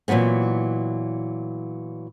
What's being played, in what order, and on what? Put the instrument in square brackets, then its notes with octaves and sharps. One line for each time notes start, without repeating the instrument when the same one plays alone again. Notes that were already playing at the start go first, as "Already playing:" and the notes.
[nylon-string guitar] A#2 E3 F#3 B3 C4